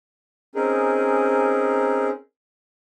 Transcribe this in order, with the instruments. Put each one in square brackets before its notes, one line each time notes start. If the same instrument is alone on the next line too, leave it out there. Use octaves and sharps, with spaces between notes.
[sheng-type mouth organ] C4 C#4 D#4 G#4 A#4